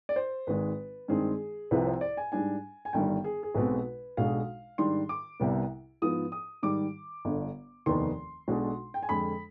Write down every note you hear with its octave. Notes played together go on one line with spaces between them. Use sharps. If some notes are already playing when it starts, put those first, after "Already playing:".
D5
C5
G#1 G#2 D#3 G#3 B4
G2 D#3 G#3 C4 D#4 G#4
C2 C3 F3 C4 B4
C5
D5
G#5
G#2 G3 D4 G#5
G#5
G1 G2 D#3 G3 G5
G#4
G#4
B1 B2 G#3 C4 B4
B1 B2 G#3 D4 F5
G#2 D#3 G3 D4 C6
D6
C2 C3 G3 B3
G#2 F3 B3 D#6
D#6
G#2 D#3 G3 D6
G1 G2 D3
F1 D#2 D#3 B3 D#4 C6
B1 B2 G#3 D4
G5
G#5
F2 D3 G#3 B5